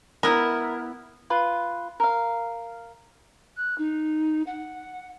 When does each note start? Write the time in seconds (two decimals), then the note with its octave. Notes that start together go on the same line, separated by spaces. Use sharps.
0.23 B3 E4 A#4
1.30 F4 B4
2.00 A#4 F5
3.56 F#6
3.77 D#4
4.46 F#5